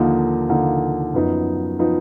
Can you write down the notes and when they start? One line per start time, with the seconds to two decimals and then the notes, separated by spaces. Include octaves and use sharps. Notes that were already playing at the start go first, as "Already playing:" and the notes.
Already playing: D#2 D3 F3 A#3 D#4
0.49 D#2 D3 F3 A#3 D#4
1.14 F#2 F3 B3 D#4
1.79 F3 B3 D#4